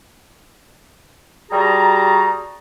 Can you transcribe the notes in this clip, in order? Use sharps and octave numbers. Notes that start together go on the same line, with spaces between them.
G3 F#4 G#4 A5 A#5